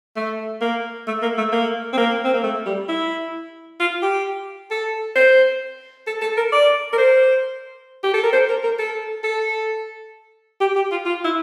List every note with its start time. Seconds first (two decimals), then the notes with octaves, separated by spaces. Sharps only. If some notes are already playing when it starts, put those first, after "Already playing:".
0.16 A3
0.61 A#3
1.07 A3
1.22 A#3
1.38 A3
1.53 A#3
1.93 C4
1.98 A#3
2.24 C4
2.34 A#3
2.43 A3
2.66 G3
2.89 E4
3.80 F4
4.02 G4
4.71 A4
5.15 C5
6.07 A4
6.22 A4
6.37 A#4
6.52 D5
6.93 A#4
6.98 C5
8.04 G4
8.14 A4
8.24 A#4
8.33 C5
8.49 A#4
8.64 A#4
8.79 A4
9.24 A4
10.61 G4
10.76 G4
10.91 F4
11.06 F4
11.24 E4